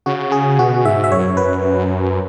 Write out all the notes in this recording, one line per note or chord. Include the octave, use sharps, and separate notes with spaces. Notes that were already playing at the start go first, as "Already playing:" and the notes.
C#3 F#4
G#4
B2 F#4
G#2 E5
E5
F#2 C#5
B4